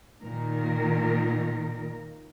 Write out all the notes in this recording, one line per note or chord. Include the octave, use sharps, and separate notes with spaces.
A#2 D#3 A#4